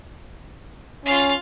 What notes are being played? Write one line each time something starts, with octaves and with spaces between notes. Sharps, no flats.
C#4 F4 F5